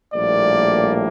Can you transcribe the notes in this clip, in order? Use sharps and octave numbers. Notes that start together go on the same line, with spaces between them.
A#1 A2 G3 A#3 D5